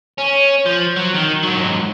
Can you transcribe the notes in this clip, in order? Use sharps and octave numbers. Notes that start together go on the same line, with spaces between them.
C#4
F3
F#3
D#3
G#2 F#3